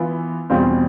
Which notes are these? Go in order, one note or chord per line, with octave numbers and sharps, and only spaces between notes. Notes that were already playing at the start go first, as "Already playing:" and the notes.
Already playing: E3 B3 F4
E2 B2 G3 C4 F4